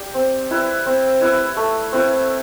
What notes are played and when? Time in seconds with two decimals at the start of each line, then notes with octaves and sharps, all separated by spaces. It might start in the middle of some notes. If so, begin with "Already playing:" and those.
Already playing: G4 D5
0.14 C4
0.50 E4 B4 E5
0.86 C4
1.21 E4 B4 E5
1.57 A3
1.92 C4 E4 B4